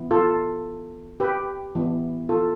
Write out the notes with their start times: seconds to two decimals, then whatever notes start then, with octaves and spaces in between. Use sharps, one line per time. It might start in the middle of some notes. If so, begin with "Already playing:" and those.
Already playing: E3 B3
0.11 F4 A4
1.20 G4 B4
1.75 E3 B3
2.29 F4 A4